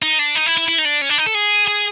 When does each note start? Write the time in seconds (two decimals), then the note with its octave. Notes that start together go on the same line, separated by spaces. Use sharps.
0.02 D#4
0.19 D4
0.35 D#4
0.46 E4
0.58 E4
0.68 E4
0.79 D#4
0.85 D4
1.02 C#4
1.10 D4
1.18 D#4
1.26 A4
1.35 G#4
1.68 G#4